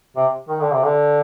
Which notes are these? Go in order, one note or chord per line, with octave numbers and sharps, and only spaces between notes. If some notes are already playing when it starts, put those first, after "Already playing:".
C3
D#3
D3
C3
D3